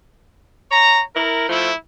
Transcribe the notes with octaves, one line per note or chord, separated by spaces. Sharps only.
C#5 A#5
E4 A#4
F3 A3 E4